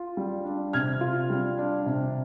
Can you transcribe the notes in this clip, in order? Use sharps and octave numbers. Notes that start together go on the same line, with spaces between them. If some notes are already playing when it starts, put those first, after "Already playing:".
Already playing: F4
G3
D4
C3 F6 G#6
F4
G3
D4
C3